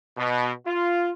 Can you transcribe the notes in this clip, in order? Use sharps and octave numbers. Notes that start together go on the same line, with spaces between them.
B2
F4